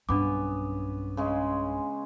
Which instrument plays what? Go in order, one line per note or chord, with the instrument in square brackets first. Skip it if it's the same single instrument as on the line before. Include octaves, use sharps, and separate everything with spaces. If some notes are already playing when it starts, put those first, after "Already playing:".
[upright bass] B1 G2 [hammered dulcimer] B3 C#4 [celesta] D4 D6
[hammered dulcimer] C#3 G#3 C#4